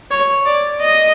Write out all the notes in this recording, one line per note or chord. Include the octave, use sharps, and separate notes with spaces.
C#5
D5
D#5